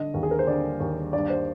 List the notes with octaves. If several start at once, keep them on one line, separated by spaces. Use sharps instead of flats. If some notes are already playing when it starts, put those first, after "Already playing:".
Already playing: D3 D#5
D#2
G#4
A#4
C5
D3 D5
D#2
G2 D5
C5